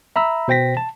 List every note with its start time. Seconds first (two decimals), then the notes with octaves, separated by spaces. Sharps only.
0.16 E5 A#5 B5 E6
0.48 B2 C5 G5 A#6 B6
0.77 A5